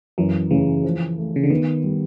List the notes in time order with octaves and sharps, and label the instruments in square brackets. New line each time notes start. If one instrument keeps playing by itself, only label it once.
[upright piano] F#2 [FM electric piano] E3
[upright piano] C#3 [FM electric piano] E3
[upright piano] F3
A3
[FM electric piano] C#3
D3
[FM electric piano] D#3 [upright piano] B3
[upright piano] G3